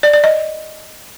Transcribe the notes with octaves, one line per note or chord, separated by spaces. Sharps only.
D5
D5
D#5